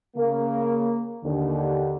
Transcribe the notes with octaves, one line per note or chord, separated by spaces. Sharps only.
C#3 A#3
D#2 D3